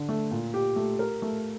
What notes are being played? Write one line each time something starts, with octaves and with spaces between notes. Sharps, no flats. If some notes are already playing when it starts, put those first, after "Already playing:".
Already playing: D3 D4
A3
A#2
G4
A3
A#4
A3